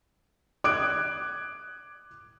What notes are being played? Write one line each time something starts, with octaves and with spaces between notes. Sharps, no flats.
D6 D#6 F#6 G#6 D7